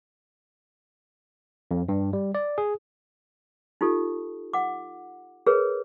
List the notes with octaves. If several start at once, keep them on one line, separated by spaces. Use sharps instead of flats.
F2
G2
G3
D5
G#4
D#4 F4 G4 A4
F#5 D6
G#4 A#4 B4 C#5